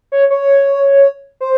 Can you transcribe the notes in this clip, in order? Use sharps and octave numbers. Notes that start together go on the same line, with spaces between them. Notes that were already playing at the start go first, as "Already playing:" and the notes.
C#5
C#5
C5